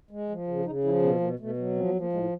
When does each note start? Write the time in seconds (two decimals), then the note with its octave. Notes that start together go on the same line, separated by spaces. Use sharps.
0.11 G#3
0.29 F3
0.47 C#3
0.65 C#3 D#4
0.84 F3 E4
1.02 B2 B3
1.20 B2 A#3
1.39 B2 A3
1.57 F#3
1.76 F3 C4
1.88 B3
1.94 F3
2.01 A#3
2.13 A2 G#3